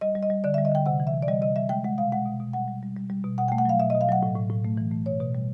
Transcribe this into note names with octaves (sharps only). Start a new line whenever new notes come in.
G3 D#5
G3
D#5
G3
D3 D5
G3 E5
D#5
D3 G5
C3 F#5
E3
E5
C3
D5
G3 D#5
C3 D#5
G3 E5
G#3 G5
G#3 F#5
B2 F5
G#3 F#5
B2
B2
G3 F#5
G3
G3
G3
G3
B2
B2 F#5
A3 G5
F#5
F#3 F5
B2 E5
D#5
B2
F5
F#3 F#5
A2
A2
A2
A3
E3
A3
B2 C#5
B2
G3